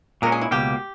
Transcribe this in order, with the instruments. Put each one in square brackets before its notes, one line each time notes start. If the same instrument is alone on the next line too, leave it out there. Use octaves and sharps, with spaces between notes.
[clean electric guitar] A#2 G#3 C#4 [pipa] A#4
[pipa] G#4
E4
[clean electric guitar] C#2 B2 A#3 [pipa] G4